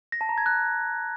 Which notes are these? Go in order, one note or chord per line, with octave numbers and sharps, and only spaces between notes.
A#6
A5
A#5
G#6
F#6